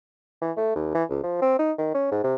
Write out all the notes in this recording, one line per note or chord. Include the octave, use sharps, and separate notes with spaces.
E3
A3
D#2
E3
C#2
F3
C4
D#4
D#3
C#4
G#2
C3